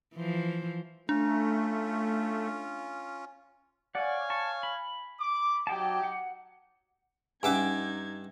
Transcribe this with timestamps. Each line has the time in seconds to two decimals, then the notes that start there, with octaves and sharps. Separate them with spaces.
0.15 E3 F3 C5
1.09 A3 C#4 D4 F4
3.95 C#5 D5 F5 F#5 G#5
4.30 A5 C#6
4.63 B5
5.19 D6
5.67 F#3 D#4 G4 G5 A5
6.03 F#5
7.43 G2 C#4 D#4 E5 F#5 G#5 D6 G#6